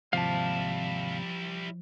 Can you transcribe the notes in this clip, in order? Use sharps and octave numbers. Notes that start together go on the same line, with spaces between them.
D#2 G#2 C3 F3 G3 E4 F5 A5